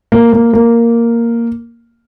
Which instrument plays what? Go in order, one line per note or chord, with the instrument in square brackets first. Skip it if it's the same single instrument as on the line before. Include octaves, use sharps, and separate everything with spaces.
[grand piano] A#3
A#3
A#3